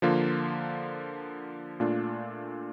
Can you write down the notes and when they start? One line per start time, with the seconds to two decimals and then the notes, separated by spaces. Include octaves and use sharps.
0.02 D3 F3 A#3 F4
1.80 A#2 A3 D4 F4